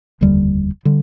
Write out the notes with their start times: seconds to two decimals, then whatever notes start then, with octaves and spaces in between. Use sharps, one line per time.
0.21 F1 D#2 D3 G3
0.85 D3 G3